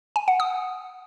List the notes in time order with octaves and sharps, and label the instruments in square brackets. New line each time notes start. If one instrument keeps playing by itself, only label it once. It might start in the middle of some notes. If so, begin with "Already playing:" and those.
[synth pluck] G#5
F#5
D#6